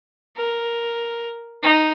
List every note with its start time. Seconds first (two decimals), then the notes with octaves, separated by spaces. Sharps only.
0.37 A#4
1.63 D#4